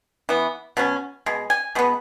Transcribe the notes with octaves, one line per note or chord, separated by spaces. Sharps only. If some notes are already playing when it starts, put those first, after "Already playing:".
E3 B3
B2 F#3 C#4
B2 G#3
G#5
B2 G#3 B3